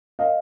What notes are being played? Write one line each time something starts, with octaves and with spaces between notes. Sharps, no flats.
D#5 F5